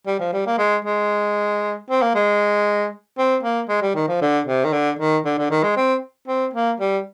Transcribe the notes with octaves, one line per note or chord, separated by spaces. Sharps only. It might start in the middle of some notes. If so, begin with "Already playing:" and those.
G3
F3
G3
A#3
G#3
G#3
C4
A#3
G#3
C4
A#3
G#3
G3
D#3
F3
D3
C3
D#3
D3
D#3
D3
D3
D#3
G#3
C4
C4
A#3
G3